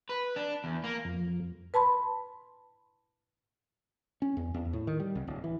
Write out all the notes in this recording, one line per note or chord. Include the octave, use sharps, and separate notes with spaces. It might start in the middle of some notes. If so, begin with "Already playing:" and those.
B4
D4
E2
A#3
F2
B4 A5 B5 C6
C#4
E2
E2
A2
D#3
G3
C2
D1
E3